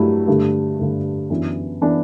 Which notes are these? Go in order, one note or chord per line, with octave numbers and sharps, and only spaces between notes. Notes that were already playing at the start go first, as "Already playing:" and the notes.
Already playing: G2 F#3 A3 E4
G2 D3 A3
G2 D3 A3
F#2 E3 B3 D4
E3 B3 D4